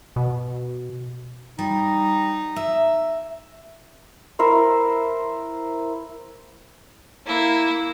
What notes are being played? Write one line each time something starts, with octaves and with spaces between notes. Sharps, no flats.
B2
G3 D#4
E5
E4 A#4 C5
A#3 E4